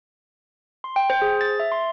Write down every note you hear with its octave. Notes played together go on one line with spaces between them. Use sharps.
C6
G5
C5
G#4
A6
E5
C6